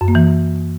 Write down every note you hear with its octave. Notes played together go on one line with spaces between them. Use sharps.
F#2
A#3
E3